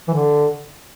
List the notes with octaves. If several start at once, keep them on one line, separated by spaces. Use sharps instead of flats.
E3
D3